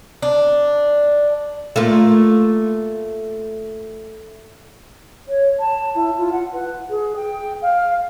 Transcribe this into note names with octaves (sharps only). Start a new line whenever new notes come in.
D4
A3 A#3 F4
C#5
A5
E4
F4
F#5
B4
G#4
G5
F5